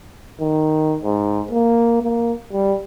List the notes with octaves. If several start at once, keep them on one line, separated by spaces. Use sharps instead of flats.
D#3
G#2
A#3
A#3
G3